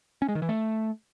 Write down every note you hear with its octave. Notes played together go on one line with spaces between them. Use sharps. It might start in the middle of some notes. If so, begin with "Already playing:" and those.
C#4
G#3
D#3
E3
A3